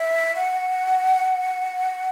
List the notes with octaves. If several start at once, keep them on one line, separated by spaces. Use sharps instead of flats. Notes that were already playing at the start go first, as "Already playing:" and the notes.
Already playing: E5
F#5